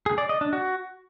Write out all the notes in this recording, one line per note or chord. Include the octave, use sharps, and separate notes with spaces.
G#4
D5
D#5
D4
F#4